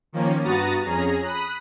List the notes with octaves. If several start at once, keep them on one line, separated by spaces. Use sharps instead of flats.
D#3 F3 A#3 C#4
G2 B3 F#4 A#5 D#6 A6
F2 C#4 G#4 A#5
B5 D#6 F#6